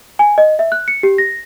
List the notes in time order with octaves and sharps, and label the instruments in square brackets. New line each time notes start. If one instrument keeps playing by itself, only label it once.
[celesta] G#5
D#5
E5
F#6
C#7
G4
A#6